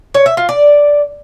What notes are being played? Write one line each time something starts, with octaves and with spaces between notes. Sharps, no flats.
C#5
E5
F4
D5